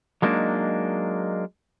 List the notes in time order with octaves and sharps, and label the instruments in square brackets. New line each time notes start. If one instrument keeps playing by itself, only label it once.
[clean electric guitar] F#3 G#3 A#3 D4 D#4